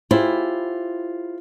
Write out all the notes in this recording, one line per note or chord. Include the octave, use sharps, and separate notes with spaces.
E4 F4 G4 G#4 C5